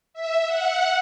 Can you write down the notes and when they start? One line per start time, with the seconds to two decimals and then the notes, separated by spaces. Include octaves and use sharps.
0.14 E5
0.46 F#5